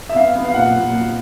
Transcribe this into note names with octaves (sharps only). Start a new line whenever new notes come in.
E5
B3 F5
B3
F5
A#2 F#5
A#2
A#2